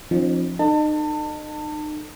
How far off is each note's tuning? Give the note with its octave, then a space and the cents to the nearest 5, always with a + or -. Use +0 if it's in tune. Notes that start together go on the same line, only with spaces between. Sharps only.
F3 +0 C4 +45 D#4 -35
D#4 -35 A4 +10 A5 +30